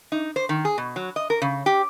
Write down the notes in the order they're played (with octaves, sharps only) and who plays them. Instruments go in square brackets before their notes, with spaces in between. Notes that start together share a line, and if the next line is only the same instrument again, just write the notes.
[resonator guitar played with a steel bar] D#4
C5
D#3
G#4
B2
F#3
D#5
A#4
C#3
G4